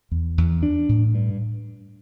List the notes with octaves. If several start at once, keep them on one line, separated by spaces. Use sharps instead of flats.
E2
E2
D4
A2
G2